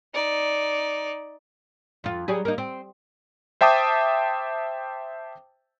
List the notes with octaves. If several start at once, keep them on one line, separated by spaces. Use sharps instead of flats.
D#4 D5
F2 F4
F#3 G3 G#4
A#3 D#4
C4
C5 E5 G5 A5 D6 D#6